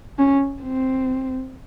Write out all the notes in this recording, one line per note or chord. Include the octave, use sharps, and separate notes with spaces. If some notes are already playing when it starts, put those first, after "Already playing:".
C#4
C4